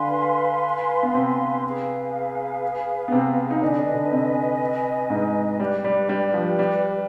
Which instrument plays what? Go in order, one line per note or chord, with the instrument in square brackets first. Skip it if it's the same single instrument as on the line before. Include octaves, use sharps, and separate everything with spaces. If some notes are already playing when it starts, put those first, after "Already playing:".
Already playing: [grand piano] D3 D4 [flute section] B4 F5 G#5 C6
[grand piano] B3
C3 C4
[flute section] G#4 B4 F5 G#5
[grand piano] B3
C3 C4
D#4
[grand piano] D3 D4 [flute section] B4 D#5 G#5
[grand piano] D3 D4
D3 D4
C3 C4
G#2 G#3
[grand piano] G3 [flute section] G4 B4 D5
[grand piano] G3
G3
F3
G3